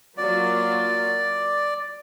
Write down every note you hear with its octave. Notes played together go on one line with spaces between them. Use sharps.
F#3 A#3 F4 D5